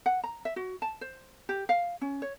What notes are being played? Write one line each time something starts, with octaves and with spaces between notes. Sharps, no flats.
F#5
A#5
E5
F#4
A5
C5
G4
F5
C#4
C#5